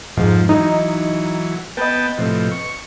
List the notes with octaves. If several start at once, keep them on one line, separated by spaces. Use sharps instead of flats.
F2 G#2 F3
E3 F#3 D#4
B3 B4 D#5 G5 A5
A2 C3 F3
C#6